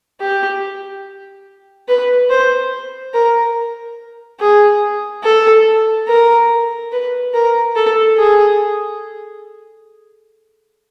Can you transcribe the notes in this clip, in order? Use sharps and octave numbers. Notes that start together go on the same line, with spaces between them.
G4
B4
C5
A#4
G#4
A4
A#4
B4
A#4
A4
G#4